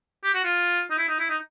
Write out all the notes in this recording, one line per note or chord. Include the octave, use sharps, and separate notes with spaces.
G4
F#4
F4
D#4
E4
D#4
E4
D#4